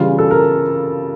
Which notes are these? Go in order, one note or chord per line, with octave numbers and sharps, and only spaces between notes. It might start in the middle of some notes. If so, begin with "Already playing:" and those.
Already playing: C#3 E3 G3 F4
A4
A#4